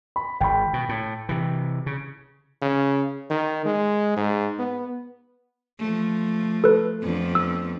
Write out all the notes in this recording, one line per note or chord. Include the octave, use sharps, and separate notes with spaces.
B5
G#1 G5 B5
B2
A2
C3 E3
C#3
C#3
D#3
G#3
G#2
B3
F3 A3
A4 B4
F2 B3 D4
E6